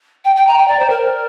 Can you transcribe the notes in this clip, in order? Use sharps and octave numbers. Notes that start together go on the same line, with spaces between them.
G5
G5
A#5
G5
D5
C5
A#4